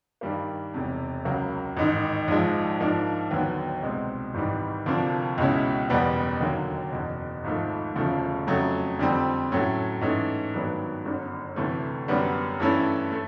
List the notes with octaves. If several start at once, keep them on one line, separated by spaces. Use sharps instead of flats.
G2 D#3 G3 A#3
E1 E2 C3
C#2 C#3 F#3 A#3
A1 G#2 D#3
A#1 G#2 F3 G#3
G#2 F3 A#3 D4
D#2 D3 F#3 B3
C2 B2 G#3 C4
G#1 G#2 E3 G3
D2 C3 F3 A#3 D4
C#2 B2 G#3 C#4 E4
F#1 E2 B2 G3 B3
D#2 D3 F#3 A#3
F#1 E2 B2
G#1 G#2 F3 A3
E1 D2 C#3 F3 A3
F2 C#3 F#3 A3
F2 D3 G3 C4
A2 F#3 A3 C#4
G#2 E3 A3 C#4
G#1 G2 D#3 F#3 B3
G1 F#2 D3
D2 C3 E3 A3
F#2 D3 G3 B3
G2 E3 A3 C#4 E4
A3